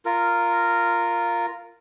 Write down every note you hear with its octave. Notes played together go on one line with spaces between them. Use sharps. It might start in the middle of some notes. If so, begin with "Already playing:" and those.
F4 A#4